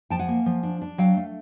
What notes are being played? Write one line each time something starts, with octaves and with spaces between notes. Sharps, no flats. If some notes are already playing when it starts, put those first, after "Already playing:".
F3 G5 A5
F#5 G#5
A#3
F3
D4
D4
F#3 F5 G5
A3